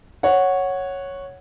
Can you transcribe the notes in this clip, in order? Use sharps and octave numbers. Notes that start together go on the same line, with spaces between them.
C#5 F#5